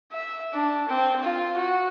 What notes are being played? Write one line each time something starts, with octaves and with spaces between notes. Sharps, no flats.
E5
D4
C4
F4
F#4